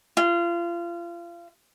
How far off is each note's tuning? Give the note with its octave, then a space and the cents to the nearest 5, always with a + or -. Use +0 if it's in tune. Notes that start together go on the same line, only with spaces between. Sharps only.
F4 -30